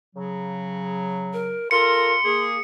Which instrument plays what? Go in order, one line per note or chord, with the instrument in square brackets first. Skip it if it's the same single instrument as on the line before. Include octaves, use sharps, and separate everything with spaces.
[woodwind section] C#3 F#3
[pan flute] A#4
[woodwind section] F4 A4 A#4 [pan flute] C6 [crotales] C#7
[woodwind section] A#3 G#4